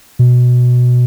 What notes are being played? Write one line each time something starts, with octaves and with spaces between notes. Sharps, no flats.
B2